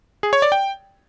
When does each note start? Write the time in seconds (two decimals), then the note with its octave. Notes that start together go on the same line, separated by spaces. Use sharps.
0.23 G#4
0.33 C#5
0.42 D5
0.52 G5